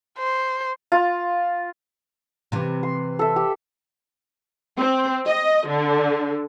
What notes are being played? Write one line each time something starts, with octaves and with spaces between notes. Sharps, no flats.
C5
F4
C3 E3
C6
A4 E5
G4
C4
D#5
D3